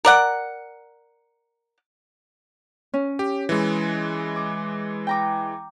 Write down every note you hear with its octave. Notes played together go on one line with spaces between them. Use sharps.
A#4 D5 F#5
C#4
G4
E3 G#3
D6
G5 A#5 D6